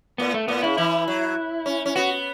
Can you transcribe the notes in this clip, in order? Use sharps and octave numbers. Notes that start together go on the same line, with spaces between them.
A2 B3
A3
A2 B3
C#3 E4
E3 E4
F#3
C#4
C#4
B3 F#4